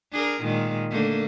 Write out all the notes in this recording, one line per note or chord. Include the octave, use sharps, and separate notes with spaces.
D4 G#4 A#4
A#2 D#3 G#3
D3 A3 A#3